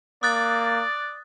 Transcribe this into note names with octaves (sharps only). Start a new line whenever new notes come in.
A#3 D5 D#6 F#6 A6